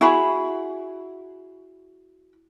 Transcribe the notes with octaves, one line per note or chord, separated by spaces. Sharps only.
E4 F#4 G#4 B5